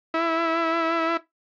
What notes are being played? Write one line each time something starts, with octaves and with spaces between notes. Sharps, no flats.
E4